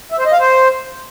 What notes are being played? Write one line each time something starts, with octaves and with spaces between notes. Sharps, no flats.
E5
C5
D#5
F5
C5